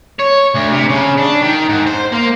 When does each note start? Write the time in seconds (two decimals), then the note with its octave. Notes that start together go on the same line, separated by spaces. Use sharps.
0.19 C#5
0.54 D2
0.71 C3
0.89 C#3
1.18 D4
1.42 D#3
1.69 G#2
1.87 C5
2.12 A#3